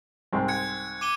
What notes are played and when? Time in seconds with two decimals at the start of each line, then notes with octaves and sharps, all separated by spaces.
0.33 C2 G#2 C4
0.48 F#6 G#6 C#7
1.01 D6 D#7 G7